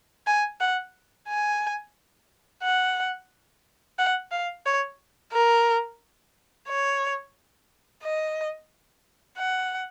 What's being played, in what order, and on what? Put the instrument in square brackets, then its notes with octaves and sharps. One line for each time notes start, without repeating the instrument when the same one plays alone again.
[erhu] G#5
F#5
G#5
F#5
F#5
F5
C#5
A#4
C#5
D#5
F#5